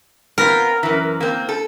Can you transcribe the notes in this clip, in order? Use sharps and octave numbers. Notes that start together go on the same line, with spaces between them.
B3 C4 F4 A#4
F#2 E3
A#3 C4
A4